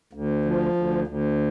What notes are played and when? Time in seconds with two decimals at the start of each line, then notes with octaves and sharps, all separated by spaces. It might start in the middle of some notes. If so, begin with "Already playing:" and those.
0.13 D2
0.45 F3
0.76 D2
1.07 D2